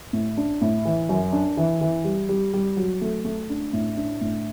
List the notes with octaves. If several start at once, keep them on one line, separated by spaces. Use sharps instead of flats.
A2
D4
A2
E3
F#2
D4
E3
E3
G3
G3
G3
F#3
A3
A3
D4
A2
D4
A2